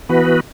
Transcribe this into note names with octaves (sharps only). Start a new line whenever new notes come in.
E3 B3 F#4 B4